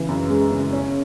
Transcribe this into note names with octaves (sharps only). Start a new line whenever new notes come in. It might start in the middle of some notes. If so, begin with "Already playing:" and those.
Already playing: C#3 E3
F#2
G#3
C#3
C#4